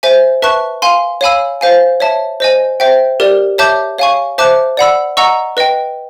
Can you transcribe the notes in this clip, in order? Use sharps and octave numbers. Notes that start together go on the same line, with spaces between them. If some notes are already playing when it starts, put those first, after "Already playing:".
C5 E5 G#5
B4 E5 A5 C#6 F#6
F5 G#5 C6
C#5 F5 G#5 B5 E6
C5 F5 G#5
C#5 E5 A5
C5 D#5 G#5
C5 E5 G5
G4 A#4 D5
C#5 E5 A5 D6 G6
C#5 F5 G#5 C#6
C5 E5 A5 D6 F#6
D5 F#5 B5 E6
D#5 F#5 A#5 C#6 E6
B4 D#5 G5